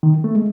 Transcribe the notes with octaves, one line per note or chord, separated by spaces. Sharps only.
D#3
A3
G#3